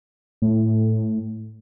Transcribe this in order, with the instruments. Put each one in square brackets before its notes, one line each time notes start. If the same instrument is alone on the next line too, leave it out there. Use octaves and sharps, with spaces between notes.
[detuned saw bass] A2